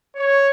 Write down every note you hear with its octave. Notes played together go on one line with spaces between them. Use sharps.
C#5